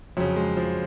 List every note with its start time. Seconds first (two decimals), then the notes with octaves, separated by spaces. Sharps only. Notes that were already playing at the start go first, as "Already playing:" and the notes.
0.17 F2 C#3 F#3
0.36 G#3
0.57 F3